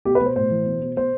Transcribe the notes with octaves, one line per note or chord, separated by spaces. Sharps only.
B2 G4
B4
B2 C5
A2 C5
E3
B2
B2
B2 C5